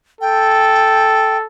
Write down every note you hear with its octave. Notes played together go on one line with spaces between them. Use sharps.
A4 G5